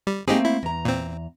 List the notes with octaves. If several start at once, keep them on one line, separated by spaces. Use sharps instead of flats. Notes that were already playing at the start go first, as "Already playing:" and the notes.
G3
A3 A#3 C4 D#4 G4 G#4
E4
E2 A#5
A#2 C4